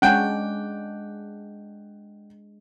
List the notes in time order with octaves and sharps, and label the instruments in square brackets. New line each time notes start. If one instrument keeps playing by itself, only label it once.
[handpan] G#3 D4 [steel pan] C#4 [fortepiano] F#5 G5